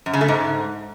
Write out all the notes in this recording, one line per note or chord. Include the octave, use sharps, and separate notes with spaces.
F#2
C#3
A3
G#2